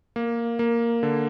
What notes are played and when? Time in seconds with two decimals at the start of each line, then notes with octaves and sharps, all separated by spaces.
0.16 A#3
0.59 A#3
1.03 D3